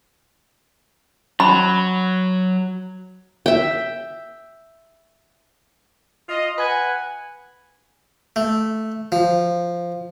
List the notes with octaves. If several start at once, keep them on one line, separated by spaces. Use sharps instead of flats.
F#3 B5
E5 G5
F4 D#5
B4 F#5 G#5
A3
F3